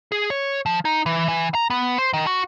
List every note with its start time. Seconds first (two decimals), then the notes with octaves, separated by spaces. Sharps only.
0.12 G#4
0.30 C#5
0.66 F3
0.85 D#4
1.06 E3
1.28 E3
1.55 A#5
1.70 B3
1.98 C5
2.13 D#3
2.27 F#4